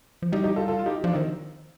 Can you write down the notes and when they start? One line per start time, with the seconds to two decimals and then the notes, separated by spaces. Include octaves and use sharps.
0.22 F3
0.32 G3 D#4 G4
0.44 D#4 G4
0.56 F4 A4
0.68 F4 A4
0.79 F4
0.86 D#4 G4
1.04 F3 D4 F4
1.13 D#3 C4 D#4